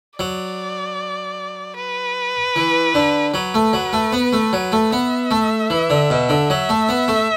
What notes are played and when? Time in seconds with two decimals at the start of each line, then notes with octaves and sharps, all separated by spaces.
0.19 F#3 D5
1.76 B4
2.56 E3
2.94 D3
3.34 F#3 B4
3.54 A3
3.73 F#3
3.93 A3
4.13 B3
4.33 A3
4.53 F#3
4.72 A3
4.92 B3 E5
5.31 A3
5.70 E3
5.90 D3
6.10 B2
6.29 D3
6.50 F#3 E5
6.69 A3
6.89 B3
7.08 A3